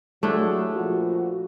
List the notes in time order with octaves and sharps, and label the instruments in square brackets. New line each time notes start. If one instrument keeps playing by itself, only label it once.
[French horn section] F#3 G4 G#4 [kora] A3 D4 E4
[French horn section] A#2 F3 F#4